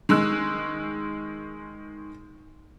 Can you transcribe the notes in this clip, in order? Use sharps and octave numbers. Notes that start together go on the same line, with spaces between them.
D#3 G#3 E6 F#6